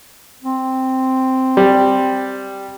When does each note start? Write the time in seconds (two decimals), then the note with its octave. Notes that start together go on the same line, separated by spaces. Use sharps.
0.42 C4
1.57 G3